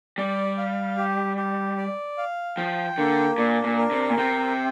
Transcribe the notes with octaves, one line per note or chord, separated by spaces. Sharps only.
G3 D5
F5
G4
G4
D5
F5
F3 G5
D3 A#3
A#2 D4
A#2
A#4
C3
A#2
C3 G5